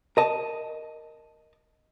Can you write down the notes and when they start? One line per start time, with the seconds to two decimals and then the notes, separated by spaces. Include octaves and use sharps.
0.17 A#4 D#5 A5